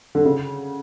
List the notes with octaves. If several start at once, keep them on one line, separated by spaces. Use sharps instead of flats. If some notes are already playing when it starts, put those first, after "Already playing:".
D3
C#3